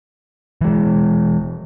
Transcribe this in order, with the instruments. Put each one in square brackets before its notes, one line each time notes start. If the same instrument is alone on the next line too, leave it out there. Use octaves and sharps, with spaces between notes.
[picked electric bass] E3 G#3